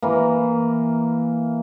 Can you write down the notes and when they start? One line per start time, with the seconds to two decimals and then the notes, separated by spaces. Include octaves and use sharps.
0.02 E3 A#3